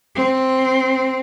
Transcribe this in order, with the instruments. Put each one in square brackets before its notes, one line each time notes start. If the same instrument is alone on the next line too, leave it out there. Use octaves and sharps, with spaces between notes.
[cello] C4